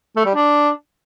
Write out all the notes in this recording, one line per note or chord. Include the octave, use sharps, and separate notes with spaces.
A3
G3
D4